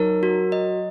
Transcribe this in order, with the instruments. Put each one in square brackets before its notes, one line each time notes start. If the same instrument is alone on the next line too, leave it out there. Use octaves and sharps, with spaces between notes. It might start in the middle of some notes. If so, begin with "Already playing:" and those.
Already playing: [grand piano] F#3 [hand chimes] D#4 A#4
[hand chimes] F#4
D#5